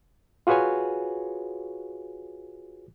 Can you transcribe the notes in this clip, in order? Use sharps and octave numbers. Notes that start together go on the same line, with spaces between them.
F4 F#4 G#4 B4 C#5 G#5